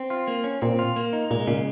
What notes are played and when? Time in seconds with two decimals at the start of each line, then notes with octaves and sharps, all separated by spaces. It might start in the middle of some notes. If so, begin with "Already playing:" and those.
Already playing: C4
0.10 F4
0.27 A#3
0.44 C#4
0.62 A#2 C4
0.79 F4
0.96 A#3
1.13 D#4
1.31 A#2 G#3
1.47 A#2 C#3